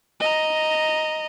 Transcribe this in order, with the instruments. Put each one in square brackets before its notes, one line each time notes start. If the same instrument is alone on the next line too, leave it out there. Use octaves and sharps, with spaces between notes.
[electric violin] D#5 A#5